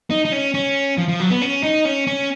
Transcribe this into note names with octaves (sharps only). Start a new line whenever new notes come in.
D#4
D#4
C#4
C#4
F3
F3
F#3
B3
C#4
D#4
C#4
C#4